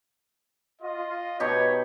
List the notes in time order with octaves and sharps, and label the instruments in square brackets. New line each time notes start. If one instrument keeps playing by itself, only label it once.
[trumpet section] F4 D#5
[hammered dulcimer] B2 D#4 G4 [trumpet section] C#5